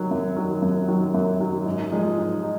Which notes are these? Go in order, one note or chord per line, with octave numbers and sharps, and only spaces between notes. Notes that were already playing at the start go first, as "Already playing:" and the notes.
Already playing: D#3 F#3
F#2
D#3 F#3
F#2
D#3 F#3
F#2
D#3 F#3
G#2
F3 G#3 D#4
G#2
D#4